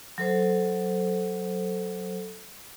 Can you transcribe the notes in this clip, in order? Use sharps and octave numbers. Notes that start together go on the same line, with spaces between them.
F#3 A4 C5